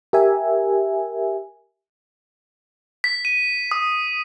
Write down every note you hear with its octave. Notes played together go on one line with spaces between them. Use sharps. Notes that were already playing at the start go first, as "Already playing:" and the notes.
G4 A#4 E5 G#5
B6
D#7
D#6